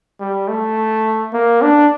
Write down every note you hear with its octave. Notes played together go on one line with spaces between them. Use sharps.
G3
A3
A#3
D4